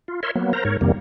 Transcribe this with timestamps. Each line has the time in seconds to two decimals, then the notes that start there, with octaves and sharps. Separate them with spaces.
0.08 F4
0.23 A#4 C#5 E5 C6
0.36 F#3 A#3 B3
0.53 A#4 C5 A#5
0.65 G#2 A#4 C#5
0.81 F2 C3 D#3 G3 A#3